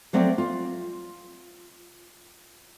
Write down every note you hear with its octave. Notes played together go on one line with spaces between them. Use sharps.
F3 F#3 A3 C4 D5
F4